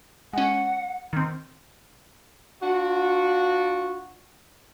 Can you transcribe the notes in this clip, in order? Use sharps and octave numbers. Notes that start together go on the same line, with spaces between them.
G#3 C#4 F#5
D#3 C4
D4 F4 F#4